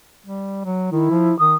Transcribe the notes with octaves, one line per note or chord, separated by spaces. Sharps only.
G3
F#3
D#3 E4
F3
D#3 D#6